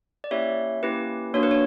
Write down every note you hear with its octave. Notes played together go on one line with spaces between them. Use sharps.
D5
A#3 C#4 E4 G4 C#5 E5
A#3 C#4 E4 G4 B4
A#3 D4 F#4 C#5
B4
C#5